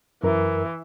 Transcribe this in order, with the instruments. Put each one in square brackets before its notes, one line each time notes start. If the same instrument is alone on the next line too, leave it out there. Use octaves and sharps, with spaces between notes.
[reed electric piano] F#2 A#4 [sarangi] E3